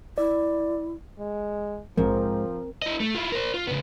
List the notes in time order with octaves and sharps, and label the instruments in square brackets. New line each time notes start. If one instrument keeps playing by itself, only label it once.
[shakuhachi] E4 [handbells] D5
[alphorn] G#3
[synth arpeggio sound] A#1 [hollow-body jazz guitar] G#2 [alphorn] F3 [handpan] C4 A#4
[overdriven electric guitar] E4 D#5
A3
E4 F4
A#4 C5
F4
C#3 B3